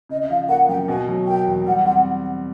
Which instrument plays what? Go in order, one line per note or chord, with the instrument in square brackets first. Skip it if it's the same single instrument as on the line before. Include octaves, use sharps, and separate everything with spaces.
[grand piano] C#3 [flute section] D#5
[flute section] E5
[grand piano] F3 [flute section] F5
[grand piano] A#3 [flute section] F#5
[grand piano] F#2 [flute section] G5
[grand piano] B2 [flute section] G#5
[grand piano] F#3
[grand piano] A#3 [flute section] G5
[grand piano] E2
[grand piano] G3 [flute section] F#5
[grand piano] C4 [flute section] F#5